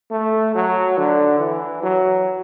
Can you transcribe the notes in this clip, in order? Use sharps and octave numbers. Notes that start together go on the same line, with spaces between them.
A3
F#3
D3
E3
F#3